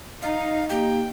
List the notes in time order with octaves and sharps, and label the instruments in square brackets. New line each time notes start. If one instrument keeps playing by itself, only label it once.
[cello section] D#4 [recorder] F5
[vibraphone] A#3 G4 F5 [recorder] G5